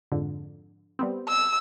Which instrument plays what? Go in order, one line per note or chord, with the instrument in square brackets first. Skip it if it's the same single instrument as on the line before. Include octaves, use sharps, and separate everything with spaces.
[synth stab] F2 G#2 D3
G3 B3 C4
[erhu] E6